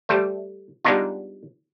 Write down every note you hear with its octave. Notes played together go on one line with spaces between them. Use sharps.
G3 A3 C5
G3 G#3 B3 D4 D#4 F4